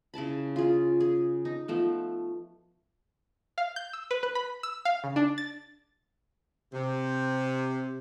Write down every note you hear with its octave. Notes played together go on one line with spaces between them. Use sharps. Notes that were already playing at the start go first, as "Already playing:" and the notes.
C#3 E4 A5 B5
F4 G#4
G#4
D#4
F3 A3 B3
F5
G6
E6
B4
B4
B5
E6
F5
C#3
D4
A6
C3